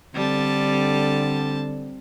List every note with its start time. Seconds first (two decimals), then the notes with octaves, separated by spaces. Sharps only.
0.15 D3 G3 C4 A5